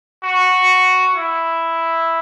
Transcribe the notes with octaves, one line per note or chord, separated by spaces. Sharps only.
F#4
E4